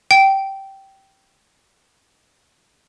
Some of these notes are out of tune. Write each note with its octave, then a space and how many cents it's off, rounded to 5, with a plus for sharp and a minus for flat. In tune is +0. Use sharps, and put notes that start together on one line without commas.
G5 -15